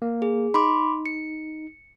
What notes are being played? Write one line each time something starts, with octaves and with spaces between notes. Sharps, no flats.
A#3
G#4
D#4 B5 C6 D6
C#7